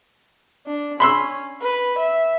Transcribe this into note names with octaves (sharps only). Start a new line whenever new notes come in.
D4
C#4 B5 C6 E6
B4
E5